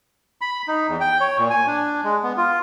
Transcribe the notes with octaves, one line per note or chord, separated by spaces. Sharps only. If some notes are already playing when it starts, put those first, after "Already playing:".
B5
D#4
E2
G5
C#5
A#2
G#5
D4
G#3
B3
F4